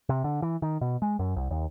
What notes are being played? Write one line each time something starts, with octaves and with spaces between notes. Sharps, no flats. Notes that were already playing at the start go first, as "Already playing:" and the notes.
C3
D3
E3
D#3
B2
G#3
F#2
C2
D#2